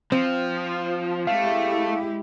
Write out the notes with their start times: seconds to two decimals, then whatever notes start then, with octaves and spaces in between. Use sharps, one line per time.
0.12 F3 C4
1.27 G#3 A3 E4 G4 F5